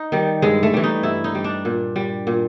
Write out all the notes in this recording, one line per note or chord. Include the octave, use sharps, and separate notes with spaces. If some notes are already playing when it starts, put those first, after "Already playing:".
Already playing: D#4
D#3 G3
G2 G#3
A3
E3 G3
D#4
G2 E4
D#4
E3 G3
D4
A#2
G3
A#2